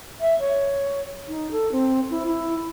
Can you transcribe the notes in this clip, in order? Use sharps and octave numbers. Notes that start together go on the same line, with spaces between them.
E5
C#5
D#4
A4
C4
E4
E4